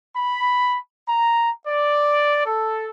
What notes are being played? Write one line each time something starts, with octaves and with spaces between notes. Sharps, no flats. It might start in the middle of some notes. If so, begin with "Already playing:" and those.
B5
A#5
D5
A4